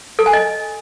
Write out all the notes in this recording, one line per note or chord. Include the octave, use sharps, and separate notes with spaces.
A4
G#5
D#5